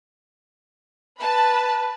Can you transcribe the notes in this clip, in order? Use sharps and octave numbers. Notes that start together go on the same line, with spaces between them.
B4 A5 B5